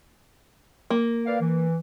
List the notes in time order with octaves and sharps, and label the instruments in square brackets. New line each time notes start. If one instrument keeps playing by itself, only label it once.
[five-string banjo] A#3
[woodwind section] B4 D5 F5
E3